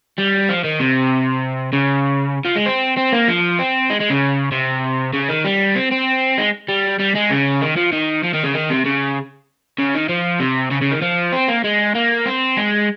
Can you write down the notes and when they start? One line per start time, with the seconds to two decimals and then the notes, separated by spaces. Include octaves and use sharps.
0.18 G3
0.49 F3
0.64 D#3
0.80 C3
1.73 C#3
2.45 F3
2.56 G#3
2.66 C4
2.97 C4
3.12 A#3
3.28 F3
3.59 C4
3.90 G#3
4.00 G#3
4.10 C#3
4.52 C3
5.13 C#3
5.29 D#3
5.45 G3
5.75 C4
5.91 C4
6.38 G#3
6.68 G3
6.99 G3
7.15 G#3
7.30 C#3
7.61 D#3
7.77 F3
7.92 D#3
8.24 F3
8.34 D#3
8.44 C#3
8.54 D#3
8.70 C3
8.85 C#3
9.78 C#3
9.94 D#3
10.09 F3
10.40 C3
10.71 C#3
10.82 C#3
10.92 D#3
11.02 F3
11.33 C4
11.49 A#3
11.64 G#3
11.95 A#3
12.26 C4
12.57 G#3